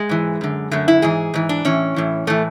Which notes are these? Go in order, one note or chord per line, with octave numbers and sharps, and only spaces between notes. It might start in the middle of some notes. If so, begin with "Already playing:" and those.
Already playing: G#3
G#2 E3
F#2 D3
F#2 D3 A3
E4
G#2 E3 G#4
G#2 E3
D4
A2 E3 C#4
A2 E3
A2 E3 A3